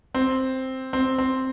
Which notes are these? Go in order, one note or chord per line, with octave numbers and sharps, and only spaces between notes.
C4
C4
C4